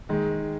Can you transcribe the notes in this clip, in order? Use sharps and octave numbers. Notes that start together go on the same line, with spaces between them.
D#3 G#3